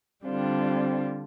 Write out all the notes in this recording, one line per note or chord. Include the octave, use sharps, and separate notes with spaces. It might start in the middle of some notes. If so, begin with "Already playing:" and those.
D3 G3 C4 D4 F4